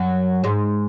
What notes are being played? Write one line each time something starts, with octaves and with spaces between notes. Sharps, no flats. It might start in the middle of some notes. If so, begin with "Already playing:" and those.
Already playing: F#2 F#3
G#2 G#3